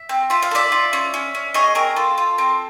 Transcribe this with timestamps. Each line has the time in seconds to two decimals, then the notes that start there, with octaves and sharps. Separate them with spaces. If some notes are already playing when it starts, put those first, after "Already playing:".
Already playing: E5
0.09 C4
0.30 F4 E5
0.42 F5
0.51 A4
0.55 D5 E5
0.72 F4
0.93 C#4
1.14 C#4
1.35 C#4
1.54 G#4 C#5 D#5
1.75 C4 A#4
1.96 F4 A4
2.18 F4
2.38 C4